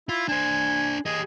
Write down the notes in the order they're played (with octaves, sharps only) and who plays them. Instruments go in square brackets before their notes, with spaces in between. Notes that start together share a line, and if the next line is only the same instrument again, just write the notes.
[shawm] E4 [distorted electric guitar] F4
[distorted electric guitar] D4 C5 [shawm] G#5
[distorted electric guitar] G4 D#5 [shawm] G#4